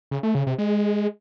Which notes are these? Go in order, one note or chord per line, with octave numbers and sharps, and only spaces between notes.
C#3
A3
C#3
C3
G#3